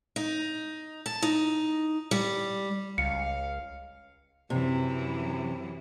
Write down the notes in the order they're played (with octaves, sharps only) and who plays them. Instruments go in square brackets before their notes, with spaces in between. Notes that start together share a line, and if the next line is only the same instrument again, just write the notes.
[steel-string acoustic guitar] D#4
A5
D#4
G3
[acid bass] C#2 [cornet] F5 [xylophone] C#7
[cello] F#2 E3 [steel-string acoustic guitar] C3